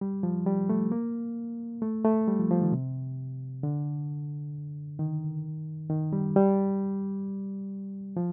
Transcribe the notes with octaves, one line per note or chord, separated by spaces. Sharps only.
G3
F3
G3
A3
A#3
A3
A3
G3
F3
F3
D#3
C3
D3
D#3
D#3
G3
G3
F3